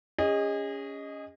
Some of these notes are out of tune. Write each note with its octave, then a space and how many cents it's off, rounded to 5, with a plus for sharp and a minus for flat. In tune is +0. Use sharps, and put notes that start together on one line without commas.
C#4 +20 G#4 -35 D#5 +0